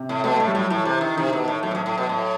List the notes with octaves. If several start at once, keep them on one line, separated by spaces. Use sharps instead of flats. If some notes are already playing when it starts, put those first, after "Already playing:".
Already playing: C3
A2
B2 A3
A2 A3
G3
A2 F#3
A2 E3
C3
D#3
C3 D#3
B2
A2
A2 F#3
B2
A2
A2
B2
A2